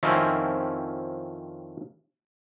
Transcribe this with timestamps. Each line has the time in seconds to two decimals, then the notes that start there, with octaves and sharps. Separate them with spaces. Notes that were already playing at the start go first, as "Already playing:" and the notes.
0.03 F2 D#3 F3 C4 C#4 E4